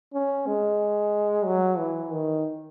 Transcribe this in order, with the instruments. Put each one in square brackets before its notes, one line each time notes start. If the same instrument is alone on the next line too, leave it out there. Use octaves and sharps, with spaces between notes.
[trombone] C#4
G#3
F#3
E3
D#3